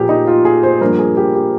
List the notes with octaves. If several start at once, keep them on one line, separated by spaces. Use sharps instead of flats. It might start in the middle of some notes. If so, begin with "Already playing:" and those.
Already playing: A#2 F3 A#3 G4 G#4
D#4
F4
G#4
C5
G2 F3 A#3 A#4
G#4
G4
G4